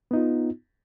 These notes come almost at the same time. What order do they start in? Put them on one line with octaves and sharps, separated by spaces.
B3 D#4 F4